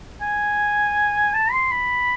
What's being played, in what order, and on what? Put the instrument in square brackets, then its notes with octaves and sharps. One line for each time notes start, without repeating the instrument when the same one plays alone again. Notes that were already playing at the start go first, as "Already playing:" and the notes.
[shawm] G#5
A5
C6
B5